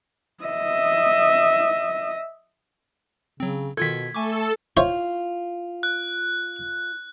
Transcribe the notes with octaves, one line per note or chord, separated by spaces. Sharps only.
D#5 E5
C#3 F#3 C4
B2 D#3 F4 A4 G#6 B6
A3 A4 G#5 C#6 D6
F4 C5 C#5 E5
F#6